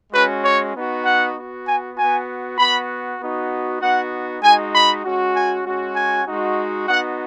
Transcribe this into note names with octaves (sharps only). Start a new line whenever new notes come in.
G#3 C#4 F#4 B4
C#5
B3 D#4 F#4
F#5
B3 F#4
G#5
B3 F#4 G#5
B3 F#4 B5
B3 D#4 F#4
B3 D#4 F#4 F#5
G#3 D#4 F#4 G#5
B5
G#3 C#4 F#4
G#5
G#3 C#4 F#4
G#5
G#3 D#4 F#4
B3 D#4 F#4 F#5